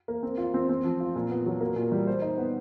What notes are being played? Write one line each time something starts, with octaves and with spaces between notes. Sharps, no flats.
A#3
C4
F4
C4
C4
F3
F4
A#2
B3
F#3
A#3
A#2
G3
C5
D#4
B3